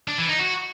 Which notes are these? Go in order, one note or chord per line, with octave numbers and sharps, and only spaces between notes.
D4
E3
D#4
F#4